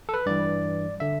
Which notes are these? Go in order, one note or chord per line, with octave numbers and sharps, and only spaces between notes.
A4
B4
G2 E3 D5
D3 E5